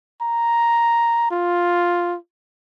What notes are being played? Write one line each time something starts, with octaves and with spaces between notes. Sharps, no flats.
A#5
F4